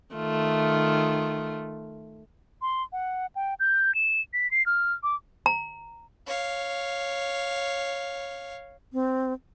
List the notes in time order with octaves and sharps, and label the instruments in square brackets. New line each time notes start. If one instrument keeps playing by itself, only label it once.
[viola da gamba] D#3 A3 F4
[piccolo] C6
F#5
G5
G6
E7
B6
C7
F6
D6
[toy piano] A#5
[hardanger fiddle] C#5 F5
[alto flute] C4